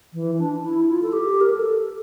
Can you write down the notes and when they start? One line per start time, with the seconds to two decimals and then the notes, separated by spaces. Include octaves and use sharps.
0.14 E3
0.39 D4
0.64 E4
0.89 F4
1.02 A4
1.13 G4
1.41 A#4
1.50 A4